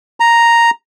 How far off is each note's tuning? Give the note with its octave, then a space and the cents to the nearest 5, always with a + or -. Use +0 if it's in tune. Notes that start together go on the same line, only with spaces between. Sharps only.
A#5 +0